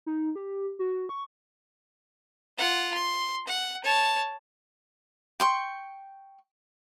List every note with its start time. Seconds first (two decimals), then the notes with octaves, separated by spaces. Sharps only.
0.06 D#4
0.35 G4
0.79 F#4
1.09 C#6
2.58 F4 F#5
2.94 C6
3.47 F#5
3.84 C#5 A5
5.40 G5 C6 C#6